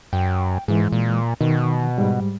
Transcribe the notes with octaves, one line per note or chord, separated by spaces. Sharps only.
F#2 G5
G#2 E3 G#3
A#2
B2 D#3
G#2 G3